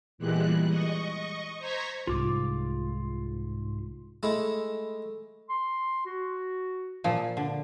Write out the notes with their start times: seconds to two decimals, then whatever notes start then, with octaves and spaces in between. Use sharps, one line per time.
0.18 E2 A#2 E3 G3 G#3 F#6
0.67 D#5 C#6
1.58 C5 A#5 C#6 G#6 B6
2.07 C2 G#2 F4 D6
4.23 G#3 A3 E4
5.50 C6
6.06 F#4
7.04 A#2 F3
7.37 D3